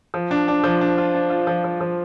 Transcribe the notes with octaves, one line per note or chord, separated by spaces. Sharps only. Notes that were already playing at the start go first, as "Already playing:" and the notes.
F3
D4
D4
F3
D4
F4
D4
F4
F3
F3
F3